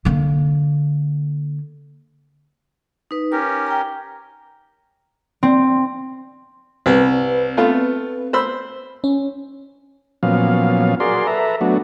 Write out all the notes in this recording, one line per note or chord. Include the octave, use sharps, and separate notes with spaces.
D3 A#3
D#4 B4
C#4 G4 A#4 D6
G5 A#5
C4
C2 C4 B4
A3 B3 F4
C5 B5 E6
C#4
A#2 F3 F#3 B3 C#4 F5
F#4 G#4 A#4 D5 C6
A4 B4 E5 A#5
F#3 A3 B3 D4 F#4